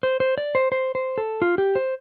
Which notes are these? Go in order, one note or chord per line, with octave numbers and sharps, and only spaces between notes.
C5
C5
D5
C5
C5
C5
A4
F4
G4
C5